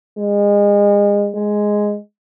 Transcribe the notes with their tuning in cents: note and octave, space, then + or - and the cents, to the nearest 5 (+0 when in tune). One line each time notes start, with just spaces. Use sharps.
G#3 -30
G#3 +0